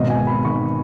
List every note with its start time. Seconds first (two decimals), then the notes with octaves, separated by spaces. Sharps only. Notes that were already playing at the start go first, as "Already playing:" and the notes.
Already playing: G#1 B2 D#5
0.10 G#5
0.19 G#1
0.27 B5
0.45 D#3 C#6